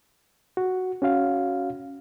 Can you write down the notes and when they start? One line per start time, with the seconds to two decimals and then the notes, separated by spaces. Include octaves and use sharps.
0.57 F#4
1.02 C#4 F#4 F5